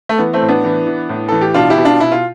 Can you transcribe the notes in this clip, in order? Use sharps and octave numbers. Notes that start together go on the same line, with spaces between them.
A3
E3 B3
A3 C4
A2
B3 D4
E3
E3
A2
E3 A4
G4
B2 D4 F4
E4 G4
B2
D4 F4
B2 E4
F4